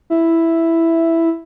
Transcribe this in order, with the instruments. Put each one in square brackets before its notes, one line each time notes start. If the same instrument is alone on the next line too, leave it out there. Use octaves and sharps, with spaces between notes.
[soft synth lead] E4